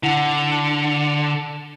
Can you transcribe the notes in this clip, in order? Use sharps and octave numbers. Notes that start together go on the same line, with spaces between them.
D3 E4 F#5 F7